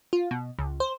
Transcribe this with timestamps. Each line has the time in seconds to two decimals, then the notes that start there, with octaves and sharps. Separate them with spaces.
0.13 F4
0.31 B2
0.59 C#2
0.80 C5